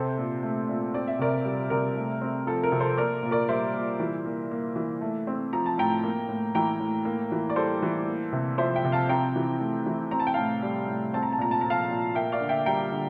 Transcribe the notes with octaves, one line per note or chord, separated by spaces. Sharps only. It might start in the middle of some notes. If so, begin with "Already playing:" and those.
Already playing: C3 C4 A4 C5
A#2
A3
A#2
C4 D5
E5
C3 A#4 D5
G3
C3 A#4
A3
C4
F3 A4
A#4
C3
A4 C5
A#3 A#4 D5
A#2
A#4 D5
G3 C5 E5
A#2
E3
A#3
A#3
E3
A3
C4
F3 A#5
A5
A2 G5 A#5
A#3
A2
E3 G5 A#5
A2
A#3
E3
D5
G3 A4 C5
E3
A#3
C3
F3 C5 E5
E5 G5
C3
F5 A5
C4 G5 A#5
E3
A3
E3
C4 A#5
A5
G5
A2 F5 A5
G3
A2
C4 A5
A#5
A5
A#2 A#5
A5
F3 A#5
F5 A5
A#2
A#3 E5 G5
D5 F5
D3
E5 G5
G3 G5 A#5
D3